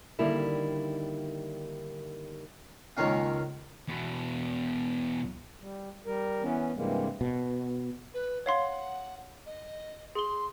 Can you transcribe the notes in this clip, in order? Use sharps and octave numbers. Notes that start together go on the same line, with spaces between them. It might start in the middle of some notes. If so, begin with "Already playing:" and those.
D3 D#3 G3 A#3 E4
C#2 D#3 A#3 C#4 F5
E2 B2
G3
G3 A#4
E3 B3 C#4
G2 C3 E3 G3 G#3 A#3
B2
B4
C#5 F5 F#5 C6
D#5
G#4 C6 G7